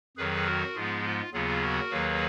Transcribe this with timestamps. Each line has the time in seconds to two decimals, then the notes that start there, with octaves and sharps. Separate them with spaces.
0.17 F2 D#3 F#3 G#4 B4
0.46 F#4 A#4
0.75 G#2 F3 G#3 B3 F4 G#4
1.04 F4
1.33 D#2 C#3 F#3 B3 F4 G#4
1.62 F#4 A#4
1.91 D#2 D#3 F#3 A#3 G#4 B4